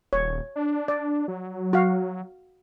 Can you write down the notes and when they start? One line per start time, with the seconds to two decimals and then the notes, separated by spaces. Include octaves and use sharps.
0.13 D#1 C#5
0.56 D4
0.88 D5
1.28 F#3
1.73 F#4 F5